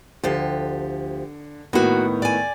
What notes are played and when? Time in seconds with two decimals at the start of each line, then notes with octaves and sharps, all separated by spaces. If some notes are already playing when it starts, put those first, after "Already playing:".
0.24 D2 D3 F3 G4
1.73 A2 D#3 A#3 B3 F#4
2.22 D5 G#5